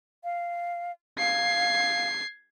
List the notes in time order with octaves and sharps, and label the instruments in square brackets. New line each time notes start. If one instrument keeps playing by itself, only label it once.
[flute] F5
[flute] F5 [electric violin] G#6 C7